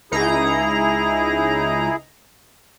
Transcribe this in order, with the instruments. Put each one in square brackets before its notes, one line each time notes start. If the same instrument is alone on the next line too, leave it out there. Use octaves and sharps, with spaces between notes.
[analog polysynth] C#2 D#4 A#5 [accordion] E4 G#4